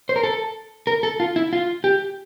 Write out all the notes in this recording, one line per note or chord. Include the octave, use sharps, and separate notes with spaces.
C5
A#4
A4
A#4
A4
F4
E4
F4
G4